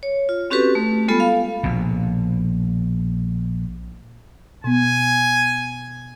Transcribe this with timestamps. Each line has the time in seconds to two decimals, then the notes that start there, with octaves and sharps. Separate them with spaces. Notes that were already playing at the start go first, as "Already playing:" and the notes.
0.03 C#5
0.29 F4
0.50 C4 C#4 F#4 G4 A4 B4
0.75 A3
1.08 G3 G#3 B3 F4 A4 B5
1.20 A4 F5
1.63 A#1 B2
4.64 B2 B3 G#5